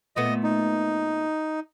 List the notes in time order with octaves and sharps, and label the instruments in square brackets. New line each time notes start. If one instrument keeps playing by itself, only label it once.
[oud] A#2 A3 B3 [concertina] D#5
[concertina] D#4